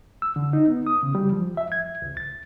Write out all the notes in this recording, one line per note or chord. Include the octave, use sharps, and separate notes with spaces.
E6
D3
D#4
B3
D#6
C#3
G3
F3
E5
G#6
C#2
A6